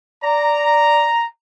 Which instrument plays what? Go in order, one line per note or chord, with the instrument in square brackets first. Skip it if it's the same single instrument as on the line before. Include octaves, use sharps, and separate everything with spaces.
[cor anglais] D5 [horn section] A#5